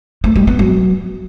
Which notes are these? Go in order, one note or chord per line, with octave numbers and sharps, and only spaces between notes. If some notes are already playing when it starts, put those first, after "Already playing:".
A3
G3
B3
F#3